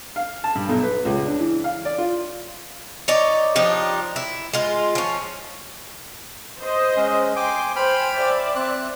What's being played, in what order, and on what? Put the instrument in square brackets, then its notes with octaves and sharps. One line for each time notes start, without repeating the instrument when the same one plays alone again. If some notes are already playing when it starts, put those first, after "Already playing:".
[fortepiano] F5
A5
G2
B1
B4
C#2
D4
E3
F5
D5
F4
[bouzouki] D#4 C#5 D5
F3 D4 D#4 G4
E4
G#3 F4
F3 C#4
[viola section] C5 D#5
[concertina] G#3 C#4
[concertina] G5 G#5 D6 [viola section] C6
[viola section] C5 G#5 [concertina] G5 B5 F6
[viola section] C5 D5 E5
[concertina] C4 F#6